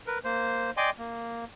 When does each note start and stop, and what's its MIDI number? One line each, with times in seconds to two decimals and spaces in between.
0.07 0.18 70
0.07 0.18 71
0.24 0.71 58
0.24 0.71 72
0.77 0.90 74
0.77 0.90 75
0.77 0.90 79
0.77 0.90 80
0.77 0.90 84
0.77 0.90 86
0.98 1.45 58